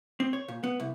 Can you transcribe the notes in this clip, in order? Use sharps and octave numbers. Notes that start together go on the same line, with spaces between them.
C4
C#5
A#2
B3
C2